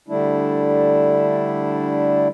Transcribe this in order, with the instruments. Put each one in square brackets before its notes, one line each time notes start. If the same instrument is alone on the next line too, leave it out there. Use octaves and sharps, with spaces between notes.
[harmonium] D3 G3 A3 D4 E4